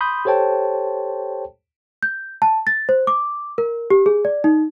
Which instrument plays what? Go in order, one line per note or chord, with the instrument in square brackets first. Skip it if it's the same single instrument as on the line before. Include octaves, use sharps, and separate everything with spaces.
[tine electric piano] B5 C6 D#6 G6
G4 A4 C5 C#5 G5 A5
[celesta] G6
A5
A6
C5
D6
A#4
G4
G#4
D5
D#4